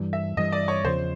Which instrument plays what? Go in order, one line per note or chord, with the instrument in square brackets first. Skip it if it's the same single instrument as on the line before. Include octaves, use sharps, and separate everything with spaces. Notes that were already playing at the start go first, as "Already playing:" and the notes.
Already playing: [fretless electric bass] G2 E3 G3
[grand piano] E5
[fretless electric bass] G2 E3 G3 [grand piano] D#5
[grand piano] D5
C#5
[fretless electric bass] E2 C#3 F3 [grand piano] C5